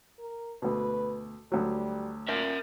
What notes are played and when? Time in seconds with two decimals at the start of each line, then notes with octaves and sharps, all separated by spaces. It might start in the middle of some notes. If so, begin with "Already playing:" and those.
0.19 A#4
0.62 D2 B2 B4
1.52 D2 F#3 G3
2.29 A#2 A#4 E5